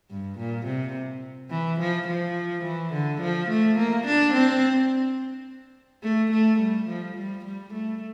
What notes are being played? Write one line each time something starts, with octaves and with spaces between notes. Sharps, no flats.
G2
A#2
C3
E3
F3
F3
E3
D3
F3
A3
A#3
D4
C4
A3
A3
G3
F3
G3
G3
A3